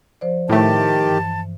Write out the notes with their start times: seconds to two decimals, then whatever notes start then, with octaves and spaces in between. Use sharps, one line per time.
0.21 F3 C5 D5
0.49 A2 D#3 A3 G4 A5
1.05 G2 E3